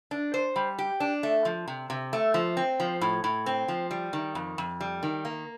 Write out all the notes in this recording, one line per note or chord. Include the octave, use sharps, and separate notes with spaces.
D4
C5
G3
G4
D4
A3
F3
C3
C3
A3
F3
C4
F3
A2
A2
C4
F3
G3
D#3
F2
F2
G3
D#3
A#3